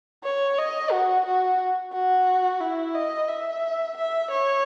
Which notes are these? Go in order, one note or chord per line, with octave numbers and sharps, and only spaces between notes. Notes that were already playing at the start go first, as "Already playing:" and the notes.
C#5
D#5
F#4
F#4
F#4
E4
D#5
E5
E5
C#5